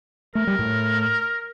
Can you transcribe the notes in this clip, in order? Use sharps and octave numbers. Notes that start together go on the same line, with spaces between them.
A3 A#4
G3
A2 A3